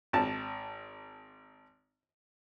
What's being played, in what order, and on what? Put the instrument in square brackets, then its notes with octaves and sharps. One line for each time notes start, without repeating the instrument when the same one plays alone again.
[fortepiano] G#1 A5